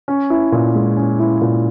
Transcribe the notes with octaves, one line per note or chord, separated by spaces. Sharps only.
C#4
E4
A#2
G#3
C#4
E4
A#2